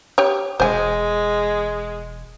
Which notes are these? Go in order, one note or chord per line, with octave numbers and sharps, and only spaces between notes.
G4 C#5
E1 G#3 C5 G#5